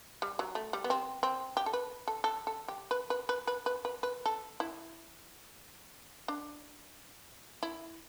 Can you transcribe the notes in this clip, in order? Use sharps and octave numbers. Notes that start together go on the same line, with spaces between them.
G3
F#3
A3
G3
B3
C4
C4
G4
A4
B4
A4
A4
A4
G4
B4
B4
B4
B4
B4
B4
B4
A4
E4
D4
E4